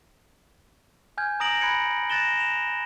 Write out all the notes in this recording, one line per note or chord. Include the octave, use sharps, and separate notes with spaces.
G#5 F6 G6 G#6
A#5 D#6 A#6 D7 F#7
A#5 B5 F#6 G#6 C#7 D7
F#6 A6 A#6 E7 G7
E7 F7